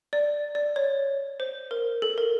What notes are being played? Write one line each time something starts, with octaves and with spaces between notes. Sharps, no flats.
D5
D5
C#5
C5
A#4
A4
A#4